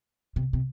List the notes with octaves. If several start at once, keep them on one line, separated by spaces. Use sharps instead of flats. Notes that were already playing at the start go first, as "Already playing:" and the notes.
C3
C3